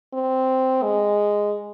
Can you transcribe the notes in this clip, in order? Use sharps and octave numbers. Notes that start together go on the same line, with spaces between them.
C4
G#3